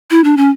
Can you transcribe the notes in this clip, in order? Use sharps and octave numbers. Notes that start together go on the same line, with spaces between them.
E4
D4
C#4